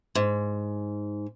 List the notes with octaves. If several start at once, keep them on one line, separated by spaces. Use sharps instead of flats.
G#2